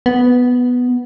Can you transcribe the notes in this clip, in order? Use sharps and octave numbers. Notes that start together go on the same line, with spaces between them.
B3